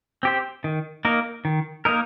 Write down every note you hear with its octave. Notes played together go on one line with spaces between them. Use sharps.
C4 G4 C5
D#3
A#3 D#4 A#4
D#3
A#3 D#4 A#4